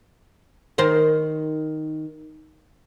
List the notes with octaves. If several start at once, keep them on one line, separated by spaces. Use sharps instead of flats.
D#3 A#4 C5